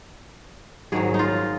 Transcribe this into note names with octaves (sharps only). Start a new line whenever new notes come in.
G#2 D#3 F#3 G#4
D#4
F4